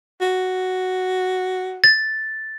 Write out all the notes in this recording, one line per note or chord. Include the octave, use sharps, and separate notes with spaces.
F#4
A6